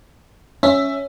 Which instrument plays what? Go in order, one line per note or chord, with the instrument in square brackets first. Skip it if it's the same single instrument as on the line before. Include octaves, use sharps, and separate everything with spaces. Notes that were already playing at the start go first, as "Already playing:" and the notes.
[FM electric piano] C#4 [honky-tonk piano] E5